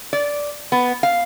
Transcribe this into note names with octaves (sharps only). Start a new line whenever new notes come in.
D5
B3
F5